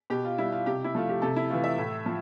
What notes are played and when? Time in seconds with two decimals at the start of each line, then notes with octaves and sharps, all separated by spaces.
0.10 B2 G4
0.25 F4
0.38 G3 E4
0.52 F4
0.66 C3 G4
0.84 E4
0.95 F3 A3 F4
1.09 G4
1.22 C3 A4
1.36 E4
1.50 E3 A3 F4
1.64 E5
1.78 A2
2.06 F3